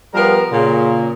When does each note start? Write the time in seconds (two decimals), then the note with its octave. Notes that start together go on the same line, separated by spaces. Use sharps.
0.14 F3 G3 B3 A#4
0.51 A#2 C#3